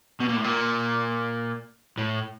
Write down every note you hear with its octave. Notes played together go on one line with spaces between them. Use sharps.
B2
A#2
A2
A#2
A2